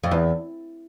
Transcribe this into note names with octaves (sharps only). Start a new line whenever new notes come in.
F2
E2